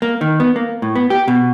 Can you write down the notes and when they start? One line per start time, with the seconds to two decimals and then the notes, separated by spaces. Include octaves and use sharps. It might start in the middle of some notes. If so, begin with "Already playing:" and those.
0.02 A#3
0.21 D#3
0.40 B3
0.56 A#3
0.82 A2
0.96 B3
1.10 G4
1.28 B2